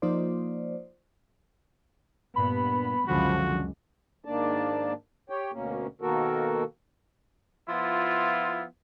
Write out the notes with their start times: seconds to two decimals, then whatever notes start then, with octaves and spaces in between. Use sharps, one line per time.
0.02 F3 A#3 D#4 F4 C5 D5
2.36 G2 A#2 B3 B5
3.08 C#2 F#2 D3 F3 F#4
4.25 G#2 D#3 A#3 D4 D5 A5
5.30 G4 C#5 G5
5.53 D2 B2 A#3 C#4
6.01 B2 D#3 A#3 F#4 A4 A#4
7.69 F3 B3 E4 F4